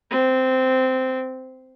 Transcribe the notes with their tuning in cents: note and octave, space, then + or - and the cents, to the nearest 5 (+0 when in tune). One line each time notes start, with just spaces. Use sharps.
C4 -10